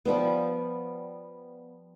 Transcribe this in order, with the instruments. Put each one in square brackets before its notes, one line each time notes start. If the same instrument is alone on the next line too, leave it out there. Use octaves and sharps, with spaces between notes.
[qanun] F3 G3 B3